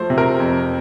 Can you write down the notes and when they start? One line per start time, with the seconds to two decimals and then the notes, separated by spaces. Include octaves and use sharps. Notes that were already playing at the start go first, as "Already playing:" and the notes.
Already playing: F3 A3 C5
0.10 C3
0.18 A#4
0.40 F2